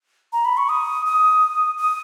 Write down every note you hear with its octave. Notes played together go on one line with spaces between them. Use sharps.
A#5
B5
C#6
D#6
D#6
D#6